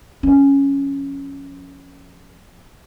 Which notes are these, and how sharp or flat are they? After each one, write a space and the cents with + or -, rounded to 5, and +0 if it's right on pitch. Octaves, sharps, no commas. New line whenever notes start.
F3 +10 C#4 +0